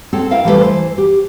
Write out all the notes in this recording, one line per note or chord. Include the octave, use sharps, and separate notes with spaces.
C4 A4 C#5
E4 A#4 E5 F5 G5
E3 G3 A3 B3 A4 B4
E3 C5
G4